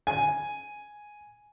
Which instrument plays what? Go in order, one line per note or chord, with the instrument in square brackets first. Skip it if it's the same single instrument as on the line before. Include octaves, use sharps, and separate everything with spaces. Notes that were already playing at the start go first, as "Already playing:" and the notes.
[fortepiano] G#5